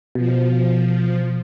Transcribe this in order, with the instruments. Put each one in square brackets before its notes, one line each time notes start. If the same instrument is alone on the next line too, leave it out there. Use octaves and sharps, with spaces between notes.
[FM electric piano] B2 [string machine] F3